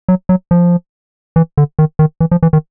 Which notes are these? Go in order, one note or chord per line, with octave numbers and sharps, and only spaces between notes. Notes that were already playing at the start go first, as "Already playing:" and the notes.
F#3
F#3
F3
E3
D3
D#3
D#3
E3
F3
E3
D#3